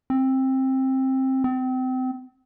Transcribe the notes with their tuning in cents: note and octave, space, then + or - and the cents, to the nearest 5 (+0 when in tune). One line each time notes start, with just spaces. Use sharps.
C4 +15
C4 -30